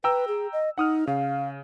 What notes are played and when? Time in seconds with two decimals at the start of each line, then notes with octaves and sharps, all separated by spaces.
0.04 B4 G5 A#5 E6
0.28 G#4
0.53 D#5
0.78 D#4 F#5 D#6 F6
1.07 C#3 F5